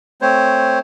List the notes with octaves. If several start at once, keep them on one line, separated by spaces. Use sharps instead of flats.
A3 C4 C5 C#5